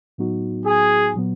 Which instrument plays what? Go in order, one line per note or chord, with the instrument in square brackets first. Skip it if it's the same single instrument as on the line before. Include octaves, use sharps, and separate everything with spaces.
[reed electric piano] A2 F#3 B3 D#4 F#4
[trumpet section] G#4
[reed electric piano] A#2 F#3 B3